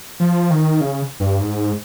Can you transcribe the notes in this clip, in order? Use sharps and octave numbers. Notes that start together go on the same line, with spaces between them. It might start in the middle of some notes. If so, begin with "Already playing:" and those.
F3
D#3
C#3
G2
G#2